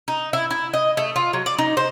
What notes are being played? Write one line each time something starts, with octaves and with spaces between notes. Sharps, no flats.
D#4
E4
E4
D#5
A3
F4
F#3
D5
D#4
C5